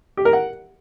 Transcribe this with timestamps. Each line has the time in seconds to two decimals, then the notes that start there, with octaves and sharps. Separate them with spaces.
0.17 G4
0.25 A#4
0.33 F#5